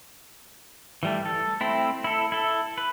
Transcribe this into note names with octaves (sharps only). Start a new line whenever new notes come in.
E3 G3 A3
A4
A3 C4 E4
E4 A4
E4 A4
B4